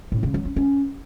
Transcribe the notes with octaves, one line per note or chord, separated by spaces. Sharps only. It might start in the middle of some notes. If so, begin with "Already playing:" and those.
A2
C#3
F#3
C#4
C#4